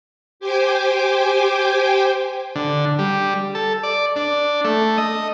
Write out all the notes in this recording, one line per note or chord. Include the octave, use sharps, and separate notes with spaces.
G4 C5 G5 G#5 D6
D3
G3
A4
D5
D4
A3
D#5